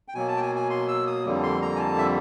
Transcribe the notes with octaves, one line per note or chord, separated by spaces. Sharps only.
G5
B2 F#3 A#3 G#5
A5
G5
G#5
G#5
C6
E6
D#6
F2 D3 G3 A#3
C6
A#5
G#5
A5
E5